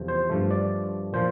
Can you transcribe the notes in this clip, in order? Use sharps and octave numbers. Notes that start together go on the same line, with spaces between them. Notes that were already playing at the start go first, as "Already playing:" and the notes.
Already playing: E2 C3 F3 A3
C5
G2 F3 A3
D5
A#2 F3 C5